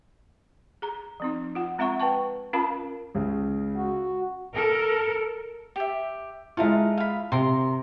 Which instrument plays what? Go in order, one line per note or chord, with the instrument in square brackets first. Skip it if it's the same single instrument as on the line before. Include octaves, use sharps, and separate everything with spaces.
[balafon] G#4 A#5
F3 C4 D#4
F4 F#5
G#3 C4 E5 F#5 A#5 C#6
B4 G5 A5 C#6
C#4 F4 A#4 F5 A5 B5
[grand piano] C#2 C#3
[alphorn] F#4
[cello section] A4 A#4
[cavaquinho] G4 E5
[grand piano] G#3 E4 F4 [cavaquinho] A4 F5 A#5
[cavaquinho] F5 B5
[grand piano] C3 [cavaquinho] A#4 A#5 C6